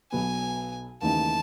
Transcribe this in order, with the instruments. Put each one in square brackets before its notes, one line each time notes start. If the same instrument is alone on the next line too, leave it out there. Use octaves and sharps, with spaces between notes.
[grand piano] B1 B2 F#3 B3 [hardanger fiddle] G#5
[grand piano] D#2 C#3 E3 A3 D#4 [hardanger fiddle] A5